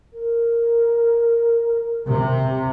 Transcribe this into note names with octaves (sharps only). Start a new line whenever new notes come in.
A#4
C3